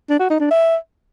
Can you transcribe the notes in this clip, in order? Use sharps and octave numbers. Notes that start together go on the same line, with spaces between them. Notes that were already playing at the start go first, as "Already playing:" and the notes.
D4
F#4
D#4
D4
E5